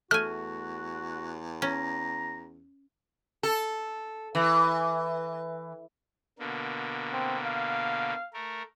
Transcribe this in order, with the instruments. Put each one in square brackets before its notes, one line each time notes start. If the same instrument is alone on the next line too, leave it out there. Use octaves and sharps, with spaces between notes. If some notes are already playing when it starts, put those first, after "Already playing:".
[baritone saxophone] E2 [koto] A3 G#5 [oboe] F#4 [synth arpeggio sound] F6
[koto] C#4 [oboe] A#5
[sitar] A4
E3
[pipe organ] B2 D3 A#3
[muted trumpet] C4
F5
[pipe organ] A3 A#4